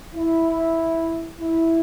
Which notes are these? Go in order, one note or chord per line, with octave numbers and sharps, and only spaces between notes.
E4
E4